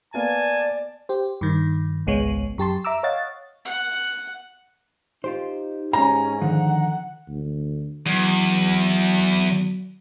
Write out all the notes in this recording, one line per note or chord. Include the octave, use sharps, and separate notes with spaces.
A#3 B3 D5 F5 G#5 A5
G4 C5
G2 D#3
G#1 C#2 G#3 B3 C#5
F#2 G4 A5 C6
E5 A#5 D6 E6
C#5 D#5 F5 F#5 A6
F#5
D#4 F4 G4 C5
G#2 C#4 A#5
D3 D#3 F3 F#5
D2
E2 F#3